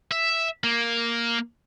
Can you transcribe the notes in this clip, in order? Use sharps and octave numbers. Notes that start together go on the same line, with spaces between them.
E5
A#3